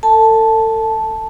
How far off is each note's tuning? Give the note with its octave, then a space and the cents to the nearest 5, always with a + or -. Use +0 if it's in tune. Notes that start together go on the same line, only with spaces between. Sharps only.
A4 +35 A5 -5